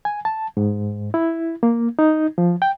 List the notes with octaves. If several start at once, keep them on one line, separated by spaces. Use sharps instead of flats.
G#5
A5
G#2
E4
A#3
D#4
F3
G5